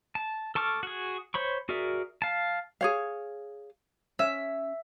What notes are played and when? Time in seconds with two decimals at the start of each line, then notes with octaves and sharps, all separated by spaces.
0.15 A5
0.55 A4 A5 C#6 D6 F6
0.83 F#4 G#4
1.34 C5 C#5 B5 C#6
1.69 F#4 G#4 A#4 D5 E5
2.22 F5 A5
2.81 G#4 C#5 F5
4.19 C#4 E5